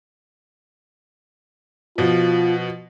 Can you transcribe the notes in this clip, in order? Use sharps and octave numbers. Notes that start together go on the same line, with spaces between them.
B2 F3 F4